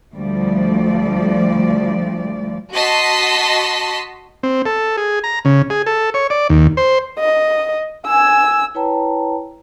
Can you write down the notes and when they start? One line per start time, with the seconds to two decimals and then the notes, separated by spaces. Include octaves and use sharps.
0.16 D2 F3 G3 D5
2.73 F#4 D#5 A5 C6 B6
4.43 C4
4.66 A4
4.97 G#4
5.24 A#5
5.45 C#3
5.70 G#4
5.86 A4
6.14 C#5
6.30 D5
6.50 D#2
6.77 C5
7.19 D#5
8.07 G#5 E6
8.75 E4 B4 C#5 G5 A5 A#5